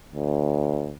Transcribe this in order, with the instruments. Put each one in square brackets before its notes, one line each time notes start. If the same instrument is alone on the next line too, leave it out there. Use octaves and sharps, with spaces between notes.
[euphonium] D2